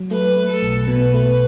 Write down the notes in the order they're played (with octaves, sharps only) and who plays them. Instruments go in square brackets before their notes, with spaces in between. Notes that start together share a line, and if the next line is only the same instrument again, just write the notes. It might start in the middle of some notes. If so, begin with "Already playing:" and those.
Already playing: [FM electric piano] F#3
[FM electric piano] A3 [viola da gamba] B4
[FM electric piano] A3
[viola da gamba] A4
[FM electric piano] B1
[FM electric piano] B2 [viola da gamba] B4
[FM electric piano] A3